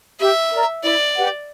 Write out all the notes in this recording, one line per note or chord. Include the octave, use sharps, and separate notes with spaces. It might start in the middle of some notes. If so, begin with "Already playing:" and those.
G4 E5
A#4 D5 A#5
E4 D5
G4 B4 F#5